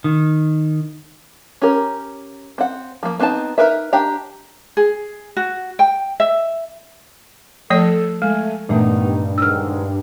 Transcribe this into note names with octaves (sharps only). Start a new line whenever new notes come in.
D#3
C#4 G4 A#4
C4 F#5
F3 A#3
B3 C4 D#4 A4 A5
D#4 G#4 A#4 B4 E5
D4 G4 G5 A#5
G#4
F#4
G5
E5
F3 A3 A4 C#5
G#3 A3 G#5
G2 A#2 D#3 E3 A3 B3 D#4
G#2 D#3 G#3 E6 F6